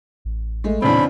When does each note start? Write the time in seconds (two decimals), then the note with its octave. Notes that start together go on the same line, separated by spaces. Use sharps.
0.25 A1
0.64 G#3 A3
0.82 E2 A#2 C#3 C4 D4 B5